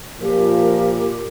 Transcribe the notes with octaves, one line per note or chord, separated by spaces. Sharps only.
A#2 F3 G4 A#4